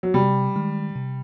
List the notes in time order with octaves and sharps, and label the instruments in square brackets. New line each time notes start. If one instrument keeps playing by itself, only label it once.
[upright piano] F#3
[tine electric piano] C3 [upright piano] G3
[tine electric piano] D#3 G#3
C3